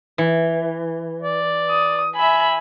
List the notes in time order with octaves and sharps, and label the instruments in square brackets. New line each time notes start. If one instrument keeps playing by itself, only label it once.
[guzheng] E3
[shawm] D5
[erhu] D#6
[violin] E5 B5 [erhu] G#5